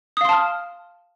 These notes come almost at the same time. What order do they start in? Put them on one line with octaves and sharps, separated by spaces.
D#6 F5 C6 A5 F6